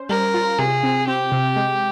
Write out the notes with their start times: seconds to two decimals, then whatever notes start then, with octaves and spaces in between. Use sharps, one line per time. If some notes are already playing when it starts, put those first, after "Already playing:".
Already playing: C#4 C5
0.09 G3 A#4
0.34 F4
0.59 C3 G#4
0.83 C4
1.07 C4 G4
1.32 C3
1.56 G#3